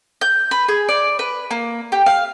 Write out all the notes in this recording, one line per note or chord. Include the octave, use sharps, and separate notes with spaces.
G6
B4
G#4
D5
B4
A#3
G4
F5